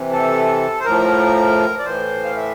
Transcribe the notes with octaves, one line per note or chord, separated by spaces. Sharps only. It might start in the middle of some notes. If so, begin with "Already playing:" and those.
Already playing: C3 E3
A4
C5
A2 F3 A#4
D5
A2 E3 C5
F5
E5